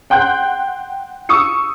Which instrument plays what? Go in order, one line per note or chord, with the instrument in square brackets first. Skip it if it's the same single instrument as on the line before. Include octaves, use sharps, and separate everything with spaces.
[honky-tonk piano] F#5 G5 C6 F#6 G6
C#6 D#6 E6 C#7